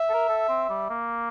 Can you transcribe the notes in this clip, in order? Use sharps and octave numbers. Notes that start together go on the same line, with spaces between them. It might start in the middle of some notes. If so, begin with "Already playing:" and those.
Already playing: E5
A4
A#4
A4
C4
G3
A#3